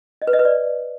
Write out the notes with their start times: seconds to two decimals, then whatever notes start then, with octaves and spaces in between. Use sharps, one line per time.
0.22 D#5
0.27 B4
0.33 D#5
0.39 B4
0.45 D5